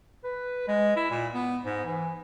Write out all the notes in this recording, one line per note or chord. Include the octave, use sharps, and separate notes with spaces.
B4
G#3
E4
A#2
B3
G#2
E3